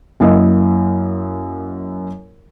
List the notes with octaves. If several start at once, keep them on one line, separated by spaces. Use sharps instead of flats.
F#2 A#3 E4 D#5